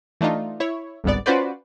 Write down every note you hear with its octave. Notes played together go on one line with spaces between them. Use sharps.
E3 A3 D4 D#4 F4
E4 C#5
G1 C2 G#2 B3 D5
C#4 F4 F#4 B4 C5 D5